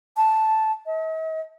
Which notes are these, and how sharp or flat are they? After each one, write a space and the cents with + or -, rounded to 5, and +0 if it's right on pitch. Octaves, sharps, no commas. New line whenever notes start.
A5 -5
D#5 +45